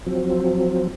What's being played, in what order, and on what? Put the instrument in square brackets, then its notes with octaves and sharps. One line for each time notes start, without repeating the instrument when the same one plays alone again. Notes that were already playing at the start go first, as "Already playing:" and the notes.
[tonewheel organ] F3 F#3 C4